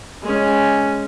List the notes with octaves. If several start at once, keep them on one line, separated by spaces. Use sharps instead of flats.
G#3 C#4